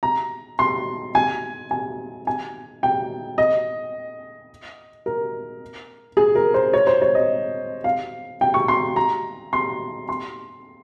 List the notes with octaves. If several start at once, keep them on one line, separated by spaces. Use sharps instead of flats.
A#5
C6
G#5
G#5
G#5
G5
D#5
A#4
G#4
A#4
C5
C#5
C5
C#5
D#5
F5
G5
C#6
C6
A#5
C6
C6